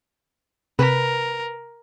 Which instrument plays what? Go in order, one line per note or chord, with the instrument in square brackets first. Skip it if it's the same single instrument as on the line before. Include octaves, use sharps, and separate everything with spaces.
[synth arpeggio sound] C3 B6 [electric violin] A#4 [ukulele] B4